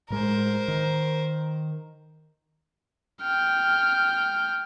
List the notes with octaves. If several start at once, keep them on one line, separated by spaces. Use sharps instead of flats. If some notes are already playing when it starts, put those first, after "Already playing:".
A2 G#3 A#4 C5
D#3
G5 F6